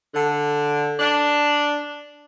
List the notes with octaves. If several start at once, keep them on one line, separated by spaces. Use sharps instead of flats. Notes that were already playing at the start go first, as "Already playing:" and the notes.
D3
D4